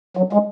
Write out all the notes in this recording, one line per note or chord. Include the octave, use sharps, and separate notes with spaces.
F#3
G#3